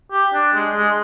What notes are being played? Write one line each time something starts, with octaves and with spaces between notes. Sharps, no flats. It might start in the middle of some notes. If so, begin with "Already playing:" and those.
G4
D4
G#3
G#3